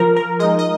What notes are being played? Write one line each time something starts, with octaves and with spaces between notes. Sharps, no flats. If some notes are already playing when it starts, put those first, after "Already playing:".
Already playing: F3 A#4
A#4
G#3 D#4 D#5
D#5